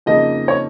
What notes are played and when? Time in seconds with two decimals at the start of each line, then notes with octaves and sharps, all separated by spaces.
0.06 F2 C#3 A#3 D#4 D#5
0.48 C#5